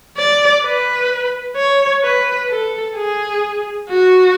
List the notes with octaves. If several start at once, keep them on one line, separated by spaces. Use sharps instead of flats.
D5
B4
C#5
B4
A4
G#4
F#4